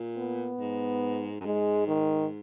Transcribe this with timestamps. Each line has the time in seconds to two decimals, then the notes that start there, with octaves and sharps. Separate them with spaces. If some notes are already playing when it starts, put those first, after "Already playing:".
Already playing: A#2
0.18 B3
0.60 G#2
1.40 F#2
1.45 G#2 G#3
1.88 D#3